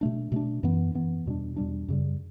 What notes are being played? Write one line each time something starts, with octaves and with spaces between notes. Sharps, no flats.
B2 A3 D4
B2 A3 D4
F#2 E3 B3
F#2 E3 B3
E2 B2 G3 D4
E2 B2 G3 D4
F#2 C#3 G3